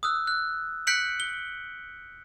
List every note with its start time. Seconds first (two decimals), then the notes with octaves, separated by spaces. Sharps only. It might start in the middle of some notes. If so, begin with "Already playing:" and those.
0.03 D#6 E6 F#6
0.27 F#6
0.87 F#6 G6 B6 C#7 D7 F#7
1.20 G7